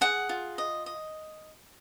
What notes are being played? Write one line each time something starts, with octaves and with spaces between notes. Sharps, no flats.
G#4 F#5
F4
D#5
D#5